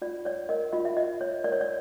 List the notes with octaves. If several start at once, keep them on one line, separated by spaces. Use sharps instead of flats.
F4 D5
C#5 D5
A#4 D#5
F4 D#5
E5
F4 D#5
C#5
A#4 D5
C#5
D5